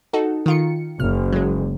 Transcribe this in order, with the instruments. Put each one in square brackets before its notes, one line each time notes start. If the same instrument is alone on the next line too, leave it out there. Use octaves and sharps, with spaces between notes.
[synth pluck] D#4 F#4 A4
D#3 F4 C#7
[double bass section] F#1 [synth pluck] F6
[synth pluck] F#3 G#3